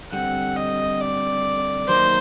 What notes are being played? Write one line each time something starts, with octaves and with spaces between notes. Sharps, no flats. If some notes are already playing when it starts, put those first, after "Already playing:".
D3 G3 C4 F#5
D#5
D5
D#3 F#3 A#3 D#4 C5